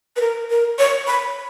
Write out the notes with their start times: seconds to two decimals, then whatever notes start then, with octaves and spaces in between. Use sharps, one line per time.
0.16 B4
0.21 A#4
0.50 A#4
0.79 C#5
1.07 B5